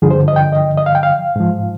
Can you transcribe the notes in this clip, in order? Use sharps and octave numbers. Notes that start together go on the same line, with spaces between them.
G2 D3 F3 G#4
C5
D#5
G5
D#5
D#5
F5
G5
F5
G#2 F3